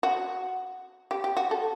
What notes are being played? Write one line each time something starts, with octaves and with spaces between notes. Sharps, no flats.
F#4
G4
G4
F#4
A4